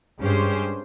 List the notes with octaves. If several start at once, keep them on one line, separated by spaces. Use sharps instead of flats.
G2 G#3 C#4 G4 C5